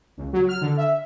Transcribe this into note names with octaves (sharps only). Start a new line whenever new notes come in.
C#2
F#3
F6
D3
E5